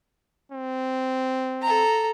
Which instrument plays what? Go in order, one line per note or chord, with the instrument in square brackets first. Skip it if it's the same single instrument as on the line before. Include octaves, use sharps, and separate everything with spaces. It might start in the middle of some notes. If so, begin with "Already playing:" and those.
[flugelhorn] C4
[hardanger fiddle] A4 A#5